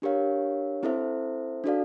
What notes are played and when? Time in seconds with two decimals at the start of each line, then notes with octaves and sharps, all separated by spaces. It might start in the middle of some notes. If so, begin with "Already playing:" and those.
0.02 D4 G4 A#4 C#5 F5
0.83 C4 E4 A4 C5 E5
1.64 D4 F#4 A4 D5 F5